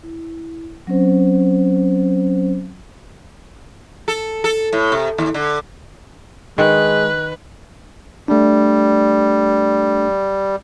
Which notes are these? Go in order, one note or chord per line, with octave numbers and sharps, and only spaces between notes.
E4
F#3 C4 C#4 C5
A4
A4
A2
C3
D#2
D3
D#3 G#3 B4 F#6
G3 A3 D4